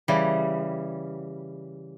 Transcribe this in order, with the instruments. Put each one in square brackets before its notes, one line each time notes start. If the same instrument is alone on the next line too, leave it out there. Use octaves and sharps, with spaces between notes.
[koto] C#3 E3 G3